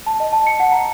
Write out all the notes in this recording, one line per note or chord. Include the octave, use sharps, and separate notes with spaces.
A5
D#5
A5
C#7
F#5
A#5